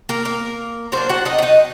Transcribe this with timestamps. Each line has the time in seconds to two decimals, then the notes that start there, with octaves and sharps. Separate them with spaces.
0.09 A#3 A#4
0.25 A#3 A#4
0.92 F#3 A#3 C4 D4 C5
1.09 F#4 F#5
1.25 D#4 D#5
1.38 F#5
1.42 D#4 D#5